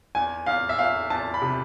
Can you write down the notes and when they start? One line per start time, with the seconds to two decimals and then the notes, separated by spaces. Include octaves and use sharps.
0.15 E2 G#5
0.46 E2 F5
0.69 E5
0.78 E2 F5
1.10 E2 A5
1.34 B5
1.42 C3